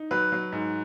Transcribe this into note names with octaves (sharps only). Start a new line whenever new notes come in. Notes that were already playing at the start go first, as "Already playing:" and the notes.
Already playing: D#4
F#3 B4
F#3
G#2